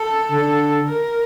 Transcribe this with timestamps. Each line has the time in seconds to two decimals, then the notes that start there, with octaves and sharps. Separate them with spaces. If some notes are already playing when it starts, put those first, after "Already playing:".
Already playing: A4
0.31 D3
0.87 A#4